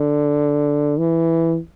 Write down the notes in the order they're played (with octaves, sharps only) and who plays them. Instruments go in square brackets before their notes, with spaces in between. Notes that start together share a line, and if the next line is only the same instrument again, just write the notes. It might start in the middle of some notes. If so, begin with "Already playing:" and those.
Already playing: [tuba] D3
E3